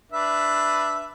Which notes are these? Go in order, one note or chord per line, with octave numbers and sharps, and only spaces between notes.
D4 B4 E5